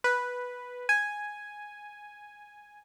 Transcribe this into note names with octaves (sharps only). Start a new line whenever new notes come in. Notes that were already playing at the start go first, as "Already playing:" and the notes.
B4
G#5